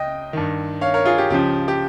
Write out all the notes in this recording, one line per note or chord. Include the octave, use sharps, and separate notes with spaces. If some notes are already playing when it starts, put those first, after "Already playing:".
Already playing: C#2 D#5 G5
G2 D#3
C#5 F5
A#4 C#5
F4 G#4
G4
C#2 C#3 F3 G4
G4